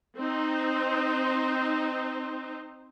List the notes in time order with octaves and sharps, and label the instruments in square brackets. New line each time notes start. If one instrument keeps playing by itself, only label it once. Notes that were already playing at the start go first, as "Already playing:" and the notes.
[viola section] C4 D#4 C5